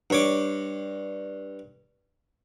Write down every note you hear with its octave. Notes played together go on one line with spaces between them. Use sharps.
G2 C#5 D6